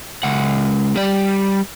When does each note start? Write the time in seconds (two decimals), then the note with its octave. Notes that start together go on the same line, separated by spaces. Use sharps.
0.23 C#2 F#5
0.96 G3 D5